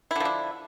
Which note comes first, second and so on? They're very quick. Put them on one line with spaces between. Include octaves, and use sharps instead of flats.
E4 D3 F3 D4